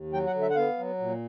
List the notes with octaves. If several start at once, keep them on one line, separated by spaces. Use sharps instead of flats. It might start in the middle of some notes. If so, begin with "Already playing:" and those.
Already playing: D#2
F#3 G5
F#5
D3
E5
F#5
B3 F5
F#3
A#2